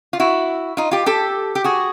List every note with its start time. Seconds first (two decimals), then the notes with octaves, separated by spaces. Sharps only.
0.13 F4
0.20 E4 F#4
0.77 D#4 F4
0.91 F4 G4
1.06 G4 A4
1.55 G4
1.64 F#4 G#4